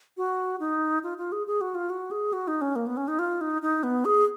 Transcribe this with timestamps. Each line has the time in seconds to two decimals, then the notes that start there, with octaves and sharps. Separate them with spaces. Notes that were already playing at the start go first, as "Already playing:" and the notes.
0.17 F#4
0.60 D#4
1.03 F4
1.18 F4
1.32 G#4
1.47 G#4
1.61 F#4
1.75 F4
1.90 F#4
2.11 G#4
2.33 F#4
2.48 D#4
2.61 C#4
2.76 A#3
2.87 B3
2.97 C#4
3.08 D#4
3.19 F4
3.41 D#4
3.62 D#4
3.83 B3
4.05 G#4